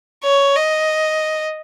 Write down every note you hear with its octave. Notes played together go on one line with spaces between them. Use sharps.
C#5
D#5